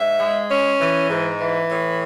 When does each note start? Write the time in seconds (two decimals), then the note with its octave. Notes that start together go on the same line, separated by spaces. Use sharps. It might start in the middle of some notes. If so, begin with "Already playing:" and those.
Already playing: G#2 E5
0.20 G#3
0.50 C#4
0.80 E3
1.09 G#2
1.39 E3
1.69 A2